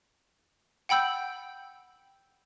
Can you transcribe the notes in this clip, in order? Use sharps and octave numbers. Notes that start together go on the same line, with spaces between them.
F#5 G5 B5 E6 G6